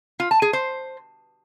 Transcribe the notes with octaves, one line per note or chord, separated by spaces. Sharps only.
F4
A5
G#4
C5